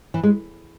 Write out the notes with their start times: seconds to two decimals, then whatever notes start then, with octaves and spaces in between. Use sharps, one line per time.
0.14 E3
0.23 G#3